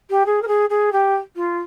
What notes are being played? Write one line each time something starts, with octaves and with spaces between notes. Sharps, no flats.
G4
G#4
A#4
G#4
G#4
G4
F4